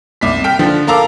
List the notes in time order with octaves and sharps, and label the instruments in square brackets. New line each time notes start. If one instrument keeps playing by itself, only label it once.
[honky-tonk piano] C2 D6 B6
G5 F6 B6
D3 F3
A4 A#4 F5 A#5 D6 E6